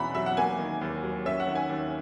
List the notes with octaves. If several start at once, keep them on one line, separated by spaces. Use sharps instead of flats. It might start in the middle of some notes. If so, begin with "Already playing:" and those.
Already playing: E2 B2 C#4 E5 F#5 A#5 B5
F#3 E5
F#5
A#3 G#5
D#3
D#2
F#3
C#4 E5
F#5
D#3
G#5
D#2